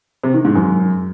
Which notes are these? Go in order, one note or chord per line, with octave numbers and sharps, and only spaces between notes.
C3
D#3
G#2
F#2